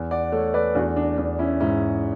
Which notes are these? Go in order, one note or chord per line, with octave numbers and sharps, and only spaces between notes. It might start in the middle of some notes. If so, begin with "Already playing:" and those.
Already playing: E2
D5 F#5
A3 A4 C#5
B4 D5
E2 D4 F#4
D4
E2 D4
C#4 E4
G#2 C#4 E4